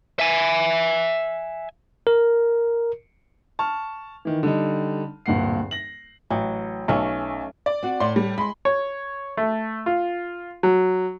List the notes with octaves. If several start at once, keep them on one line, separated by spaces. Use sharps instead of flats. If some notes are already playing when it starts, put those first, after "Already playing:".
E5 G#5
A#4
A5 C#6 F6
D#3 E3
D3 G3 D#4
D1 G2 A#2 F#5 C7
A#6 F#7
A1 F#3
B1 A3 C#4
D5
C4 F#4
A2 D5 C6
G3
G#3 B5 C6
C#5
A3
F4
F#3